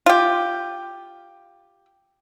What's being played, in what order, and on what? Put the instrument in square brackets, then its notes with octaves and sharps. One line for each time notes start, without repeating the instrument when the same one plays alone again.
[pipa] F4 G4